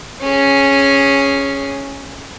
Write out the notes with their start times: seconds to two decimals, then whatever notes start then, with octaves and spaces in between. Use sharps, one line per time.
0.22 C#4 G#4